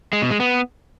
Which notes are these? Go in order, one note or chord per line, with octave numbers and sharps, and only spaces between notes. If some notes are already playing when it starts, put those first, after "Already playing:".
G#3
B2
G#3
B3